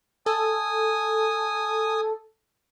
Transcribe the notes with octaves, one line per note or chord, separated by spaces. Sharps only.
A4 G#5 D#6